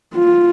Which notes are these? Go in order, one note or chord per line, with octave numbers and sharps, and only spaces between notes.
F4